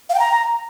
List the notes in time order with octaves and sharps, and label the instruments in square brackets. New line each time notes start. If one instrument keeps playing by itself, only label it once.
[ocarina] F5
G5
A#5